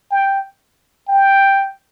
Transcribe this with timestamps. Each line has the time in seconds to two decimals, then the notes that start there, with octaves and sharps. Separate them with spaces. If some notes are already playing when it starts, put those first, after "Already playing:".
0.10 G5
1.08 G5